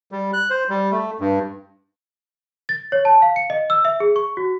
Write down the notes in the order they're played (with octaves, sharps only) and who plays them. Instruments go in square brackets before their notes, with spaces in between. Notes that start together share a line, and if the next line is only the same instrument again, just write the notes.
[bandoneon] G3
F#6
C5
G3
A3
G2
[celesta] A6
C#5
A5
F5
C#7
D#5
E6
E5
G#4
C#6
F#4